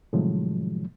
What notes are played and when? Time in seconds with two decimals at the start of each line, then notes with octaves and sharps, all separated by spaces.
0.13 A2 C3 D#3 F3 F#3 G#3